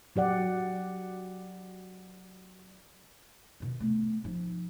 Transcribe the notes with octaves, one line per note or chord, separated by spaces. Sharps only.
F#3 G4 D5 F#5
B2 D#3
A3 B3
F3 D#4